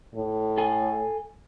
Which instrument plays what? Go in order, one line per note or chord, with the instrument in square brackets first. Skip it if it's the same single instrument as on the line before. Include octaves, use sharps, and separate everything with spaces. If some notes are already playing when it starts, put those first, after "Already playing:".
[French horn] A2
[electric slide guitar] A4 G#5